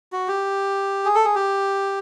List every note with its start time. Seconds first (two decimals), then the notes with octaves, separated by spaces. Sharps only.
0.12 F#4
0.28 G4
1.05 G#4
1.15 A4
1.24 G#4
1.35 G4